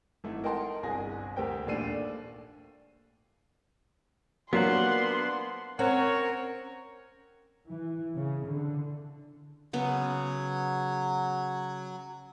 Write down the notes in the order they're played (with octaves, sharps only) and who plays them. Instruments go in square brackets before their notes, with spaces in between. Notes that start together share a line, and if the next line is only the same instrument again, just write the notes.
[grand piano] G#1 A3 E4
A#4 D#5 F#5 G5 A5 C6
G1 C2 G#4 G#5 A#6
D2 G4 A#4 C5 G5
A#1 D#2 A3 D4 C7 D#7
[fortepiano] F#3 [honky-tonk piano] A#3 D4 F4 [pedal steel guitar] B3 C5 F#5 [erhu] C6
[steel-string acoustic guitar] C4 C#4 [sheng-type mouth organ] A#4 [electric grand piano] C5 F#5 [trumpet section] C#5
[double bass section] E3
C#3
D3
[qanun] C#3 B3 [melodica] F#3